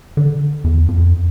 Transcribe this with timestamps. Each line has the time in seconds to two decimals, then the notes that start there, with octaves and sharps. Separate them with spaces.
0.17 D3
0.64 E2
0.88 F2